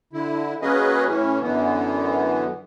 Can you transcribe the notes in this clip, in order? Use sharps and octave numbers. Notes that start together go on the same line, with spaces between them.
D3 E4
F#3 A#3 C#4 G#4 B4 D#5
A2 E3 C#4
F#2 D3 E3 B3